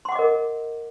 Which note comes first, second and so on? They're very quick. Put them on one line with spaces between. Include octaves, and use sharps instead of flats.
C6 F#5 D6 D#5 A#4